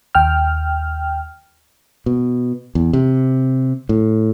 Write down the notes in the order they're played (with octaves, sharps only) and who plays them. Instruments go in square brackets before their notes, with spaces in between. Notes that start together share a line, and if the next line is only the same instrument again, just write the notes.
[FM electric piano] D#2 G5 F6
[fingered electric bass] B2
E2
C3
A2